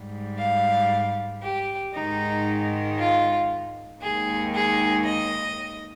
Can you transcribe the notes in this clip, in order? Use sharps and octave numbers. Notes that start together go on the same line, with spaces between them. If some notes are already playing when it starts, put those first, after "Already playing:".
Already playing: G#2 G3
F5
G4
G#2 D#3 G#3 D#4
F4
D#2 D#3 G#3 G#4
G#4
D#5